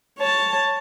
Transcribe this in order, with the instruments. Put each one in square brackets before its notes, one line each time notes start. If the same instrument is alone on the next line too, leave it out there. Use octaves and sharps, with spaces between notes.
[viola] C#5 A5